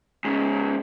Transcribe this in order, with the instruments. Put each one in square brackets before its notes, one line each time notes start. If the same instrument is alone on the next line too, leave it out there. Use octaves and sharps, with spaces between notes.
[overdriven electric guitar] G#2 C#3 [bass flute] C#4